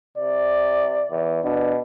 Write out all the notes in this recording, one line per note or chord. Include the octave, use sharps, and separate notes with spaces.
C3 D5
E2
B2 D4